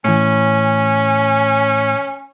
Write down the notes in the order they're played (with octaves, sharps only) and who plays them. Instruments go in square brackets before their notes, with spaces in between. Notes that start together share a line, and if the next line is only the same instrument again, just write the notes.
[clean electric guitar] A2 E3 [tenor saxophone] C#4 [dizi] G#5